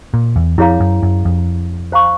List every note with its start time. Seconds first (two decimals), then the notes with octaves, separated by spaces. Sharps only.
0.14 A#2
0.36 E2
0.58 F2 E4 G#4 C#5 F5 A#5
0.80 F#2
1.03 F#2
1.25 F2
1.92 C5 F5 A#5 C#6